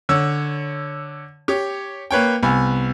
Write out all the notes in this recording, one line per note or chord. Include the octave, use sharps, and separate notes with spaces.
D3 C#5 E6
G4 C#5
A#3 B4 C#5 G5
C2 B3 G#5